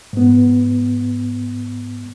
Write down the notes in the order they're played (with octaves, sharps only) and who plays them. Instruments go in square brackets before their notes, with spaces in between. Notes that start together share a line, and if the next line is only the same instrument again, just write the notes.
[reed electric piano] G#2 B3